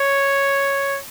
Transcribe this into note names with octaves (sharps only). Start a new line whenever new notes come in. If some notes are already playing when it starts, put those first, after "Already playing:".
Already playing: C#5